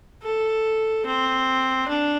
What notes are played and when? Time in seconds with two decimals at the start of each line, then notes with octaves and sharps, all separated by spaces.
0.22 A4
1.06 C4
1.88 D4